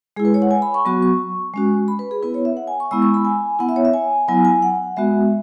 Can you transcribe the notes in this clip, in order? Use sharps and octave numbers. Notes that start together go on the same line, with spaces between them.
G#3 E4 G#4
B4
C#5
F#5
G#5
B5
C#6
F#3 B3 F#4 C#6
C#6
G#3 C#4 F#4
B5
B4
G#4
B3 E4 B4
C#5
E5
F#5
G#5
C#6
G#3 B3 E4 E6
C#6
B5
G#5
B3 E4 F#5
E5
C#5
E5
G#5
F#3 B3 E4 G#5
G#5
F#5
G#3 B3 F#4 E5